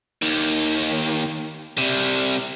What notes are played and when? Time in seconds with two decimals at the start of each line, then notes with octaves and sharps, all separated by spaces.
0.22 D#2 D#3
1.78 C3 G3